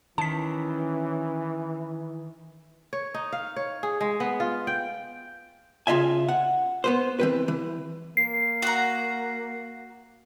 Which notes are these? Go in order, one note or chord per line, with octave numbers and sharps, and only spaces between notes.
D#3 E3 C#4 A5 B6
C#5
D#4
F5
C#5
G#4
G#3
B3
F4
G5
C#3 F4 D#5 E5 G#5
F#5
B3 B4 C5
E3 C4 B4
E3
A#3 C7
F#4 A#5